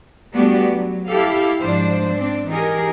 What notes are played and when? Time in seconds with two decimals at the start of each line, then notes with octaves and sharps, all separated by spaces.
0.35 G3 A3 B3 D4 F#4 G4
0.70 F#3
1.08 E4 G4 A4 F5
1.61 G#2 F3 D4 C5
2.17 C4 D4
2.48 E3 D#4 G4 G#4 A#4